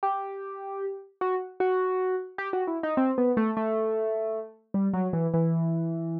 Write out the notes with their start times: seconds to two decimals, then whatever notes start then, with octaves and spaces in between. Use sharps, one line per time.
0.03 G4
1.21 F#4
1.60 F#4
2.38 G4
2.53 F#4
2.67 E4
2.83 D#4
2.97 C4
3.18 B3
3.37 A3
3.57 A3
4.74 G3
4.93 F#3
5.13 E3
5.34 E3